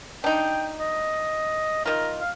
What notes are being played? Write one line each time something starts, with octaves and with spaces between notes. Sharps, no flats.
D4 D#4 G5
D#5
D#3 F4 A#4
F5